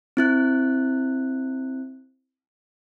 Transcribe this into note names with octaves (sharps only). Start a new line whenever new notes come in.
C4 E4 F#6